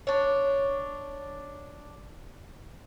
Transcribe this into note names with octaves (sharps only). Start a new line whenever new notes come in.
D4 C#5